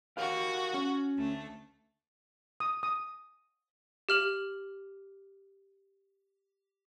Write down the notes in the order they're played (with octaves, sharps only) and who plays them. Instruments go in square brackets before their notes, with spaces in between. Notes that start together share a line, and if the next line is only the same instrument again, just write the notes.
[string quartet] F#4 F#5 [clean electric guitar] G4 A#4 F5
[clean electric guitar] C#4
[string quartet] D2 A3
[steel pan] D#6
D#6
[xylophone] G4 F6 F#7